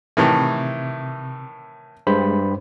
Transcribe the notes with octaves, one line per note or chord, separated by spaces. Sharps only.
A2 C3 D#3 E3
G2 G#3 C5 B5